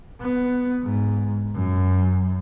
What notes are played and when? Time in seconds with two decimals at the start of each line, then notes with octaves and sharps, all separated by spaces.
0.21 B3
0.83 G#2
1.55 F#2